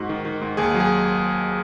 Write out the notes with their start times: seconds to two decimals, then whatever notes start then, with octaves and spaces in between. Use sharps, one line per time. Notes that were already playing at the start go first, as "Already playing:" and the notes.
Already playing: G#2 F#4
0.09 D#3
0.25 D#3
0.42 G#2
0.57 D#2 G#4
0.74 F#3
0.80 G#4